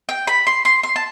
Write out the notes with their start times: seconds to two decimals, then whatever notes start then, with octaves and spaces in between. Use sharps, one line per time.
0.09 G5
0.27 B5
0.47 C6
0.65 C6
0.83 C6
0.96 A5